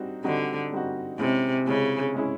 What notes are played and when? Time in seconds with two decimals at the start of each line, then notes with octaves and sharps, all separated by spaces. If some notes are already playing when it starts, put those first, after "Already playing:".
Already playing: G3 C4 D#4 F#4
0.24 D3 G3 C4 D#4 F#4
0.72 G3 C4 D#4 F#4
1.19 C3 G#3 C#4 E4 G#4
1.67 C#3 G#3 C#4 E4 G#4
2.15 G#3 C#4 E4 G#4